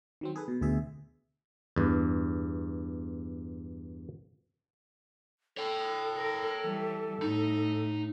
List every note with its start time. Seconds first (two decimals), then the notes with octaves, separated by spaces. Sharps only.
0.21 D#3 F#3 C4
0.36 G#4 A4 B4
0.48 B2
0.61 D2 B2 G#4 E5
1.76 E2 G2
5.57 A4 C#5 G5
6.17 A#4
6.63 E3 G3
7.22 A2 D#4